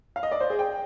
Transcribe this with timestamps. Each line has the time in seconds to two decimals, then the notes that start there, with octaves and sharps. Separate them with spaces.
0.16 F5
0.23 D#5
0.31 D5
0.41 C5
0.50 G#4
0.59 G5